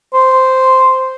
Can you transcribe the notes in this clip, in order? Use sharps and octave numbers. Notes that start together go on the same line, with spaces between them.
C5